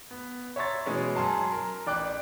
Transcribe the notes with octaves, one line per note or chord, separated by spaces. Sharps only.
B3
C#5 E5 A#5 C6 C#6 A6
B2 E3 G#3 C#4
F#2 G#5 A5 C6
A#4
A1 D5 G5 D6 F#6